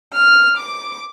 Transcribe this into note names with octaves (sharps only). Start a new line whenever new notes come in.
F6
D6